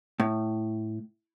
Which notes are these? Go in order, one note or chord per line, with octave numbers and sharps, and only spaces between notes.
A2